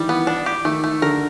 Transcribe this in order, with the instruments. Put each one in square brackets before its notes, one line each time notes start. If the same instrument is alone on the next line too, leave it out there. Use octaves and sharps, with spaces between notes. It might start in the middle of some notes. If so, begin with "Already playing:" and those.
Already playing: [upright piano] D#3 E3 [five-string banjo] G3
[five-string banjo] B3
D4
G4
[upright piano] D#3 [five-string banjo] A3
[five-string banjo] A3
[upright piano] D3 [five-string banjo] A#4